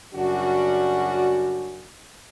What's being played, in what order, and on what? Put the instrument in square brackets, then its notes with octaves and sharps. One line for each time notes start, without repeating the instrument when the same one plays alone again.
[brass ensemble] F#2 C#3 G3 C#4 D4 F#4